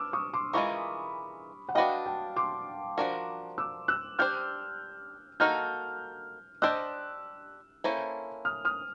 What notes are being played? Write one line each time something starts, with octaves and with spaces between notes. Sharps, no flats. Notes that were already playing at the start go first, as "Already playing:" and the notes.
Already playing: B3 D4 D6 E6 F6
C#6 D#6
C6 D6
E3 G#3 C4 F4 A#4 B5 C#6
F#5
D4 F#4 B4 D#5 F5 G5
G5 A5
C6 D6
F3 A#3 D4 F#4 A#4
D6 E6
E6 F#6
D4 G4 C5 F6 G6
A#3 D#4 F#4 A4 F6 G6
D4 G4 C5 D#5 E6 F#6
A#3 C#4 E4 A4 C5
D#6 F6
D#6 F6